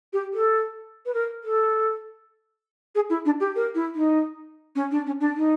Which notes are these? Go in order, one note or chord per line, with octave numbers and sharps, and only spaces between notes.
G4
A4
B4
A#4
A4
G#4
E4
D4
G4
A#4
E4
D#4
C#4
D4
C#4
D4
D#4